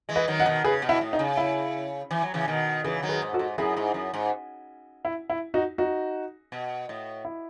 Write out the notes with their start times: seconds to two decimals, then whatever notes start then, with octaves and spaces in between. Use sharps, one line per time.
0.09 E3 G#3
0.16 B4 D#5
0.28 D#3 F#3
0.39 D#5 F#5
0.45 B2 D#3
0.64 C#3 G#4 B4
0.82 B2
0.89 E4
1.01 A2
1.13 D#4
1.19 C#3
1.37 E4
2.11 E3
2.23 F#3
2.34 C#3 E3
2.48 B2 D#3
2.84 C#3 E3 G#4 B4
3.03 D#3 F#3
3.09 G#4 B4
3.22 G#2
3.33 F#4 A4
3.39 G#2
3.58 F#2 E4 G#4
3.76 G#2
3.94 F#2
4.14 G#2
5.05 E4
5.30 E4
5.54 D#4 F#4
5.78 D#4 F#4
6.52 B2
6.89 A2
7.25 E4